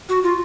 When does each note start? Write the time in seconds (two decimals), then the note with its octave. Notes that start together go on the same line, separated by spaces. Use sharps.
0.09 F#4
0.23 F4